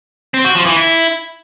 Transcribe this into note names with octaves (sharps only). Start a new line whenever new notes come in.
C4
F#4
F3
E3
E4